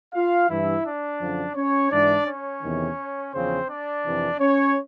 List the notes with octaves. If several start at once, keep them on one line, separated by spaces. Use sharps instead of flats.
F4 F5
G2 E3 E4 E5
D4 D5
F#2 D3 F3
C#4 C#5
G#2 E3 D4 D5
C#4 C#5
E2 C3 D#3
E2 C#3 F3 C4 C5
D4 D5
F2 C3 E3
C#4 C#5